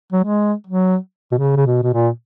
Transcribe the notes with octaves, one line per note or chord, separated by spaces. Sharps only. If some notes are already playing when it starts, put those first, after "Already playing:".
F#3
G#3
F#3
B2
C#3
C#3
B2
B2
A#2